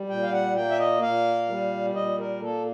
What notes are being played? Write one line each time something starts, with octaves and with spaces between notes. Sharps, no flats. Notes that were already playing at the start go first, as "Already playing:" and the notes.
Already playing: G3
A#2 G5
F5
F#5
A#3 G5
E5
D#5
A#2 F5
G3
A#2 D#5
A#4
A#3 A4